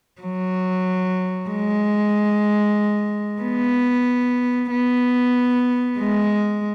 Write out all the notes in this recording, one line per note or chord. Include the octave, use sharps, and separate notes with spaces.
F#3
G#3
B3
B3
G#3